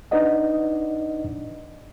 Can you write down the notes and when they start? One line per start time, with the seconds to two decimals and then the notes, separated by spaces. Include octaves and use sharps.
0.11 D4 D#4 B4 D5 D#5 F#5